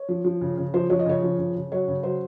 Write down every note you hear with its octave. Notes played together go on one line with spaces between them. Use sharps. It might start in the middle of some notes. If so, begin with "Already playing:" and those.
Already playing: C#5
F3
F3
C#3
C#3
F3 C5
F3 C#5
D#5
C#3 C#5
F3
C#3
C#3
F#3 C#5
C#3
F#3 C5